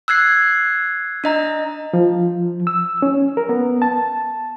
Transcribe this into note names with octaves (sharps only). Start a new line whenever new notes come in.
E6 F#6 G#6 C7
D4 D#5 A#5
F3
E6
C#4
A#4
B3
A5